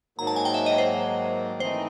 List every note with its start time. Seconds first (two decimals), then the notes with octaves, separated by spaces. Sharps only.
0.18 G#2 D#3 F#3 A#3 A#5
0.27 A5
0.36 G#5
0.45 G5
0.54 E5
0.66 D#5
0.78 C5
1.60 E3 A3 C4 D#4 C5